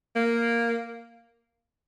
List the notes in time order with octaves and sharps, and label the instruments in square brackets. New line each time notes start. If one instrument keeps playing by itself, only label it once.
[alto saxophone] A#3